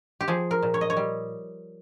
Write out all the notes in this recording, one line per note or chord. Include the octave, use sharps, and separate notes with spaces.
G4
F3 G#4
A#4
A#2
C#5
D#5
C#5
G3